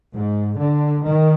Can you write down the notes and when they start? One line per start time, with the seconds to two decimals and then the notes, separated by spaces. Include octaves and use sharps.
0.13 G#2
0.59 D3
1.05 D#3